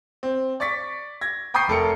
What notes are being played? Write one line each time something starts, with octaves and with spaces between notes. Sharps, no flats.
C4
D5 C#6 A6 B6
G#6 A#6
G5 B5 C#6 D#6 G6 C7
F1 A4 A#4 C#7